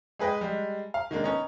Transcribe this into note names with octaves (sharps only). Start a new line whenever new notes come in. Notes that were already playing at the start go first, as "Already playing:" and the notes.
G#3 G#4 B4 D#5 G5
G3 G#3
F5
D#3 G#3 A#3 D4
B3 C#4 D#4